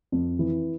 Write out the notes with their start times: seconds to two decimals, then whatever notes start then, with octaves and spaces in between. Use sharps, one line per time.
0.12 F2
0.39 E3